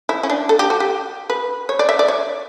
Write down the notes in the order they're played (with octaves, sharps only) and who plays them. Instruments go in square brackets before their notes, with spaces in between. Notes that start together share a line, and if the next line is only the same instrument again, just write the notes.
[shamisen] E4
C#4
D4
A4
G4
F#4
G4
B4
C#5
D5
E5
D5
C#5